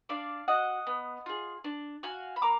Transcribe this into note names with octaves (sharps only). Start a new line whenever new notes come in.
D4 D5 F5
F#4 D#5 F#5
B3
F4 G#4
D4
F#4 F5 G#5
B5
A#3 A#5 D6